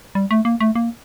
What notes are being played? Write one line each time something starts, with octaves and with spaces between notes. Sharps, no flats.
G3
A3
A#3
A3
A#3